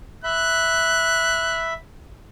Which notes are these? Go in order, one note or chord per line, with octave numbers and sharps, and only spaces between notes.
E5 B5 F#6